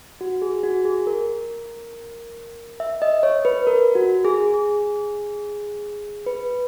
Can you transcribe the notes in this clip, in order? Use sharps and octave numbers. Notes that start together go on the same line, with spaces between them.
F#4
G#4
F#4
G#4
A#4
E5
D#5
C#5
B4
A#4
F#4
G#4
G#4
B4